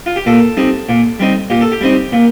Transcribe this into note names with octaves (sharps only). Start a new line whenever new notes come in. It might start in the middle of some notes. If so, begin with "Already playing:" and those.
F4
G4
A#2 A4
G3 C4 D#4
A#2
G3 C4 D#4
A#2 G4
A4
G4
G3 C4 D#4
A#2